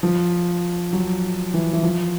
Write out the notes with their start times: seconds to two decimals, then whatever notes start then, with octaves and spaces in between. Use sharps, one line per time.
0.03 F3
0.93 F#3
1.54 E3
1.73 E3
1.83 F3